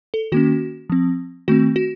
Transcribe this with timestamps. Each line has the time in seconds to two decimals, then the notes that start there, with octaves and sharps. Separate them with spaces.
0.14 A4
0.32 D#3 A#3 C#4 F#4
0.90 F3 C4
1.48 D#3 A3 C4 F#4
1.76 F#4